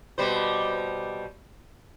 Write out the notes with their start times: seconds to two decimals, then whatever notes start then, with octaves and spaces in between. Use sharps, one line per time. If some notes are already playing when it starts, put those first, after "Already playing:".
0.18 B2 G3 C5